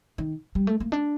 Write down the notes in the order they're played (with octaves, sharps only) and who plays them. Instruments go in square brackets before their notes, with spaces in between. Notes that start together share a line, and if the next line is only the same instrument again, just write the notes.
[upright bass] D#3
G3
A3
A#3
D4